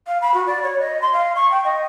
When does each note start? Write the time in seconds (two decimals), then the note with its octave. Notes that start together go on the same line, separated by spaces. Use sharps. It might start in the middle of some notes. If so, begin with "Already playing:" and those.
0.07 F5
0.22 B5
0.34 F#4
0.47 D5
0.63 C#5
0.80 D#5
1.02 C6
1.13 F5
1.36 C#6
1.51 G5
1.65 D#5